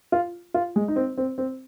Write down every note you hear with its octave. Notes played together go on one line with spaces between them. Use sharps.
F4
F4
G#3
D#4
C4
C4
C4